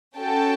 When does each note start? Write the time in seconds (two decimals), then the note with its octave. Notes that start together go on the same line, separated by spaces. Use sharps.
0.16 C#4 F#4 A4 G5 A5